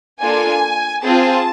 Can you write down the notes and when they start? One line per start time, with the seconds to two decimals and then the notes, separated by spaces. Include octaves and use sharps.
0.20 A#3 D4 F4 A4 G#5
1.04 C4 F4 G#4 A5